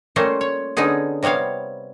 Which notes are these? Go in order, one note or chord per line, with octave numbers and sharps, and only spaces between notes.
G3 A3 A#3 C#4 F4 C5
C#5
D3 B3 C#4 D#4 G#4
C3 G3 B3 C#5 F5